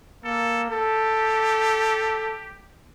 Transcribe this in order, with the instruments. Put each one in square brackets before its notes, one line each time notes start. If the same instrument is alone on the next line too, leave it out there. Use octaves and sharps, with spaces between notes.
[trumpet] A#3 [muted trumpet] A4
[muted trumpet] G4 [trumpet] A4